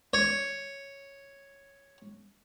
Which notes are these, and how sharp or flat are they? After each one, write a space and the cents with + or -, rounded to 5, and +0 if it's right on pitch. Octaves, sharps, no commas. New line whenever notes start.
C#5 +0